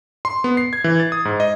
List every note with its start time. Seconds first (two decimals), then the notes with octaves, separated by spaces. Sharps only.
0.25 C6
0.44 B3
0.57 C7
0.73 G#6
0.84 E3
1.00 A6
1.12 D#6
1.25 G#2
1.40 D#5